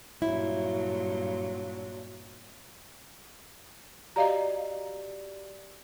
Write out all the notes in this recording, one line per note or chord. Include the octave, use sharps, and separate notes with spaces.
G2 A#2 F#3 E4
F#4 G4 D5 D#5 F5 A#5